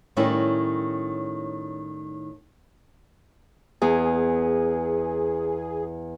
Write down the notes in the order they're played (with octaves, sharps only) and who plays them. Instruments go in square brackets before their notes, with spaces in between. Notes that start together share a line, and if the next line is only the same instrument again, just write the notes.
[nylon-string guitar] A2 D#3 G3 C#4 E4
[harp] E2 [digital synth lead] G#4